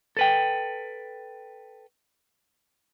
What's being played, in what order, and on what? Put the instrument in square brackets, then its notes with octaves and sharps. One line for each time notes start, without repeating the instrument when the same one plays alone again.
[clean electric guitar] A4 B4 G5